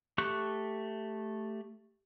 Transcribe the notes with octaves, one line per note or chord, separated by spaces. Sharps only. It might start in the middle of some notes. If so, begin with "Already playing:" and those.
A3 G4 C#6 F#6